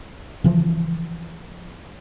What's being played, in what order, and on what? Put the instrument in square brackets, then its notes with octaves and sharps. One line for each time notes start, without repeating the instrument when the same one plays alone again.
[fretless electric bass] C#3 E3 F3